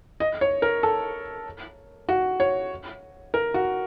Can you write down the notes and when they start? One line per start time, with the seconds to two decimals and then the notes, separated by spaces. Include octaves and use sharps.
0.20 D#5
0.41 C#5
0.62 A#4
0.83 A4
2.09 F#4
2.40 C#5
3.34 A#4
3.54 F#4